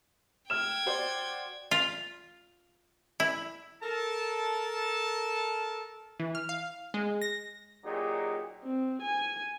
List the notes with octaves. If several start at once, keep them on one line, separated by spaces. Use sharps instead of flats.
G5 F6 G#6 E7
F#4 C5 D5
F4
E4
A4 A#4 A5
E3
F6
F5
G#3
A#6
A#2 F#3 D#4 G4 G#4
C4
G#5